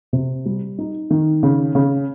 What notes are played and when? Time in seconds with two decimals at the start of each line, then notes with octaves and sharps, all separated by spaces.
0.13 C3
0.46 G3
0.78 D#4
1.11 D#3
1.43 C#3
1.75 C#3